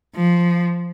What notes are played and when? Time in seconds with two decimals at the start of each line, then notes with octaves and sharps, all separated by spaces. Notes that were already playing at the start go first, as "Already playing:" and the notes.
0.16 F3